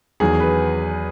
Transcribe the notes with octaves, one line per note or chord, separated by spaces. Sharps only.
E2 D#3 F#3 B3 G#4
B4